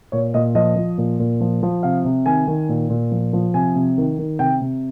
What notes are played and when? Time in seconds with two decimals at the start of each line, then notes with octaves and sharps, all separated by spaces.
0.12 A#2 C#5
0.34 A#2 D#5
0.55 F3 D#5
0.76 F3
0.98 A#2
1.19 A#2
1.41 F3
1.63 F3
1.83 C3 F5
2.05 C3
2.26 D#3 G#5
2.47 D#3
2.69 A#2
2.90 A#2
3.12 F3
3.33 F3
3.54 C3 G#5
3.75 C3
3.98 D#3
4.19 D#3
4.39 C3 G5
4.62 C3